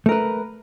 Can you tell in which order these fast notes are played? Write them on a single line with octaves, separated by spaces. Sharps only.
A3 A#4 B4